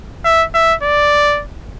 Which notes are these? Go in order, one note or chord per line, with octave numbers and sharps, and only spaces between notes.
E5
E5
D5